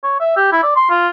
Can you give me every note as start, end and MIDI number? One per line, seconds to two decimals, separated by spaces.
0.04 0.19 73
0.20 0.32 76
0.36 0.48 67
0.52 0.60 64
0.63 0.74 74
0.76 0.86 84
0.90 1.09 65